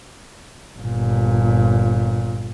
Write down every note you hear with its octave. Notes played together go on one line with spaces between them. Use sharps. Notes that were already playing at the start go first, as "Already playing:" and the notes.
G1 A#2